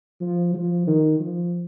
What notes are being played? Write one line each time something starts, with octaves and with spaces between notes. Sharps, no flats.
F3
F3
D#3
F3